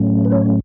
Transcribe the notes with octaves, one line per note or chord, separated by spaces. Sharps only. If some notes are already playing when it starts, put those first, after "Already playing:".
Already playing: A2 F#3 A3 C#4
B4
C#5